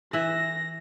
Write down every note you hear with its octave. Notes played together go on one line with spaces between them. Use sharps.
E3 E5 A#6